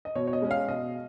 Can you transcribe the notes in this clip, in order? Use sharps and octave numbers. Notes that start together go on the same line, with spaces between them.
D#5
B2 C#5
C#5
D#5
G#3 C#4
F5
B2 D#5